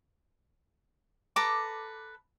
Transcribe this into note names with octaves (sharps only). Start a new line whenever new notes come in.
A4 B4 A#5 D6